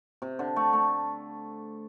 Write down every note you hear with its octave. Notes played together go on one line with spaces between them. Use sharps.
C3
D3
A3
A3